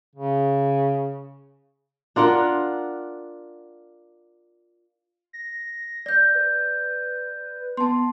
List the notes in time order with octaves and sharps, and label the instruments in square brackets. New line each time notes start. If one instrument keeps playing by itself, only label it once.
[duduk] C#3
[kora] D4 F4 A#4 F#5
[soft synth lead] A#6
[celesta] D5 G6
[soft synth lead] B4
[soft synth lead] B3 [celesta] A5 C6